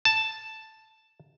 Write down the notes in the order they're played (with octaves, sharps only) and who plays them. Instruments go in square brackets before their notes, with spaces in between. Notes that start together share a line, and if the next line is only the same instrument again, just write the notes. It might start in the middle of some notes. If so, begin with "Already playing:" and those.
[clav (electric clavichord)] A5